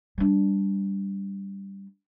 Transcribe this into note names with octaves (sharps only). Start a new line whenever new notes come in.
G3 D4